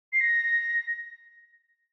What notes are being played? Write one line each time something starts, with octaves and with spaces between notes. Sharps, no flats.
C7
A#6